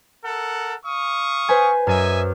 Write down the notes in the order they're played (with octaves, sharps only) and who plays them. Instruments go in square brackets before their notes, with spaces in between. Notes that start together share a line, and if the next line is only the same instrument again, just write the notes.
[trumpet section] A4 A#4 F#5
F5 C#6 D#6
[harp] B4 C5 G#5
[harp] F#2 [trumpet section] D#5 E5 G#5